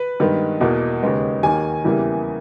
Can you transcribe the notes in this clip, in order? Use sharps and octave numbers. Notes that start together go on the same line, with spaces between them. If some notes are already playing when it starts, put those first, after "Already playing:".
Already playing: B4
G2 D#3 G#3 B3
E2 B2 A#3
D#2 C#3 G#3 B3
D#2 D#3 A#3 G#5
E2 C#3 E3 G3 A#3